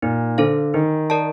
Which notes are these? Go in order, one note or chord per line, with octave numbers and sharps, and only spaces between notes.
A#2 D#4
D3 A4 C5 F5
D#3 D#4
A#4 D5 A5